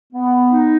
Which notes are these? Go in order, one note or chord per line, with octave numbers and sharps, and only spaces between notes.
B3
D#4